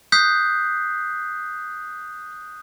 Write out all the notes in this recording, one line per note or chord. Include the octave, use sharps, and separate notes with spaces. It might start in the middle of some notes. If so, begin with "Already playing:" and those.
D#6 F#6 G6 B6 C7